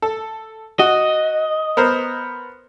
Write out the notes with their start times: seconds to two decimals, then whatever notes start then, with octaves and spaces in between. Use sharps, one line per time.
0.02 A4
0.79 F#4 D#5
1.77 B3 A#4 C5